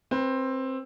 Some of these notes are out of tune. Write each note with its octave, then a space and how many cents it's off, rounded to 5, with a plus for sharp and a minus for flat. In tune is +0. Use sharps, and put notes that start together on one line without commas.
C4 +15 B4 +0